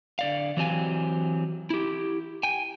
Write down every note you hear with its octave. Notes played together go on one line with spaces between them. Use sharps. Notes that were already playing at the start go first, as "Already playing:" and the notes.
D3 D5 F5
E3 F#3 C4 G4 D#5 G#5
E4 G4
G5 G#5